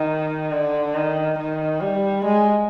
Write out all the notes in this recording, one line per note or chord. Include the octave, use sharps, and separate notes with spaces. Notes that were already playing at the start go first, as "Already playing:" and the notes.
Already playing: D#3
D3
D#3
D#3
G3
G#3